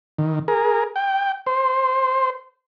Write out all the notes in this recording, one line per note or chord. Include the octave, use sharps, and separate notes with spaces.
D#3
G#4 A#4
G5
C5